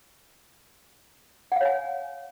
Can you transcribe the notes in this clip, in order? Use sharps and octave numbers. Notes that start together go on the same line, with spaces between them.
C#5 F5 F#5 G#5